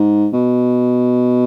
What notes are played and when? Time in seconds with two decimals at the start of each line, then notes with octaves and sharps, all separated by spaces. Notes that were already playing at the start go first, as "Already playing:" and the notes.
Already playing: G#2
0.33 B2